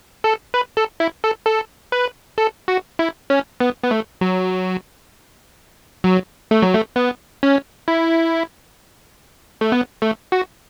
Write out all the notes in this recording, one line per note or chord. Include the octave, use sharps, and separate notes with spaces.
A4
B4
A4
E4
A4
A4
B4
A4
F#4
E4
C#4
B3
B3
A3
F#3
F#3
A3
F#3
A3
B3
C#4
E4
A3
B3
A3
F#4